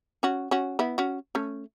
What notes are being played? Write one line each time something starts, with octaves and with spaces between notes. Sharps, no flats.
C#4 F#4
C#4 F#4
B3 E4
C#4 F#4
A3 C#4